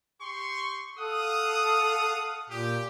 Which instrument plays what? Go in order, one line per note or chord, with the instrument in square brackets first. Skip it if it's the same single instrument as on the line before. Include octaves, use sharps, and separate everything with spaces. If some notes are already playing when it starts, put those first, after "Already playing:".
[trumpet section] G4 C6 C#6
[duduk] A4 [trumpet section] F5 F#5 D#6
[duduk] A#2 [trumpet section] G4